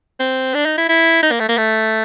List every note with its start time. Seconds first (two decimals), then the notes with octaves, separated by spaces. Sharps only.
0.19 C4
0.54 D4
0.66 D#4
0.78 E4
0.89 E4
1.23 D#4
1.31 A#3
1.40 A3
1.49 A#3
1.58 A3